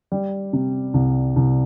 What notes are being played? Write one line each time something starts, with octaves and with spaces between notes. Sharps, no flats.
G3
C3
C2
C2